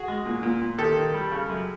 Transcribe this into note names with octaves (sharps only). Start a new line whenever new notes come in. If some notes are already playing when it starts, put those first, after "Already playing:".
Already playing: F#4 G#4
G#3
A#2
A#2
A#2
D#3 G4 A4
D#3
G3
C#3
F#2